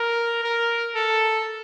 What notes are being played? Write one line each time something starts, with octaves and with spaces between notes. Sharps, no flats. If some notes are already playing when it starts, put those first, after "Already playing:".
Already playing: A#4
A#4
A4